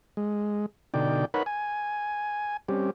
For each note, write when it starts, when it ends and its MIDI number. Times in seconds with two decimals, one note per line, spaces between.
0.17 0.66 56
0.94 1.25 47
0.94 1.25 50
0.94 1.25 63
0.94 1.25 74
0.94 1.25 79
1.34 1.43 63
1.34 1.43 70
1.34 1.43 71
1.34 1.43 73
1.34 1.43 78
1.34 1.43 83
1.46 2.57 80
2.68 2.91 55
2.68 2.91 60
2.68 2.91 61
2.68 2.91 67